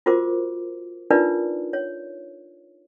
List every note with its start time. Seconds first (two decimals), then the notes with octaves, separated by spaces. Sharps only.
0.06 F4 F#4 A#4 C5 D6
1.10 D4 D#4 F4 A#4 B4 D5
1.73 C#5